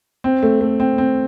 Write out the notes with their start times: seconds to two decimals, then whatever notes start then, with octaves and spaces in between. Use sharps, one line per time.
0.24 C4
0.43 A3
0.61 A3
0.80 C4
0.98 C4